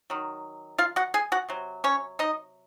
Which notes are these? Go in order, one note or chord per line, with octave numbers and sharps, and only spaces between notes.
D#3 F#3
F4 F5
F#4 F#5
G#4 G#5
F#4 F#5
C3 F#3
C#4 C#5
D#4 D#5